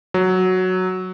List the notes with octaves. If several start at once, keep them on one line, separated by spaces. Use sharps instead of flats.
F#3